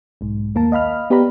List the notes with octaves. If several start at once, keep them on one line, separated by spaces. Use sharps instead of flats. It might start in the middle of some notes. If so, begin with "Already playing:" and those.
B1 G#2
D#2 A#3 A#4 A5
D#5 F5 B5 F6
B3 G4 B4 D5 A#5 B5